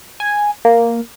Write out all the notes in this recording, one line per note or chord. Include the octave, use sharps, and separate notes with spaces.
G#5
A#3